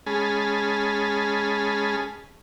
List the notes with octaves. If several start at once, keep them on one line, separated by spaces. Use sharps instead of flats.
G#3 C#4 G#4 A5 B5 F6